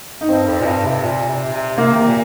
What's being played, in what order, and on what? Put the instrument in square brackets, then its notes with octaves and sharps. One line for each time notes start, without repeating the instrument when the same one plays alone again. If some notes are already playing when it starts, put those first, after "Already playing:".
[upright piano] D#4
[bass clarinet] G2 [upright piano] C4
[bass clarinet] F2
A#2
G2
C3
A#2
C3
C3
[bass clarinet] C3 [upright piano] A#3
[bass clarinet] D#3
C3
A#2